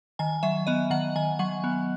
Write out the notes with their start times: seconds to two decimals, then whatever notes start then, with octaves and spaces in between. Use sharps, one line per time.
0.19 D#3 G#5
0.43 F#3 E5
0.67 B3 D#5
0.90 D#3 F#5
1.16 D#3 G#5
1.39 F#3 F#5
1.64 B3